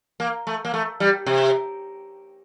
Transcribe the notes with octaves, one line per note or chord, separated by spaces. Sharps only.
A#3
A3
A#3
A3
G3
C3